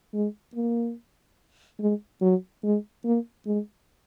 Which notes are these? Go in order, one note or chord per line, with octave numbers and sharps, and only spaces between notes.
G#3
A#3
G#3
F#3
G#3
A#3
G#3